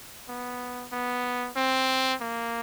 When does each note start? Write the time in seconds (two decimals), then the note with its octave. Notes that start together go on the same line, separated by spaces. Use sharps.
0.29 B3
0.92 B3
1.56 C4
2.21 A#3